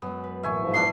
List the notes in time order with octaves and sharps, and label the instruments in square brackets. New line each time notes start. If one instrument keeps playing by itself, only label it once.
[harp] F#2 G#3 [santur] B3
[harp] B4
[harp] E1 A1 A#3 [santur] E5 G#5 C#6
[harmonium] G#2 F3
[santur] B3 D4 E5 [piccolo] C7